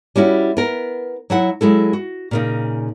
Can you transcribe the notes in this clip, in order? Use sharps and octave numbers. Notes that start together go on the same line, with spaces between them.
G3 C#4 E4 F#4
B3 A#4
F#3 E4 F#5
F#3 G#3 E4 A4
F#4
A#2 C#3 D#4